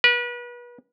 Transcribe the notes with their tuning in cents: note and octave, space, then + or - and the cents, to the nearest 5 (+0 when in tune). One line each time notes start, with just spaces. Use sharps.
B4 -35